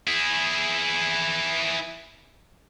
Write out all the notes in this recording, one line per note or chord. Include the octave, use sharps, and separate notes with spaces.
E4 G#4